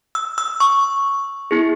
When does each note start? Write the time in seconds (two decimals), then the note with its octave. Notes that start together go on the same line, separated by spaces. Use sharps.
0.15 E6
0.38 E6
0.60 C#6
1.51 B3 E4 G#4